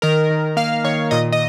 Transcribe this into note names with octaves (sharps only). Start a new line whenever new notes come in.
D#3 A#4
D#3
A#3 F5
D#3 C#5
A#2 D#5
D#5